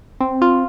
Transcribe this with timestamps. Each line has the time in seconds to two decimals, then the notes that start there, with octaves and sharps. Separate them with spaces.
0.20 C4
0.42 F4